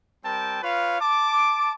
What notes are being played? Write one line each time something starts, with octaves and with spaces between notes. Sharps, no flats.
G3 C4 A#4 G5 A5
F4 B4 C#5 F5
A5 D6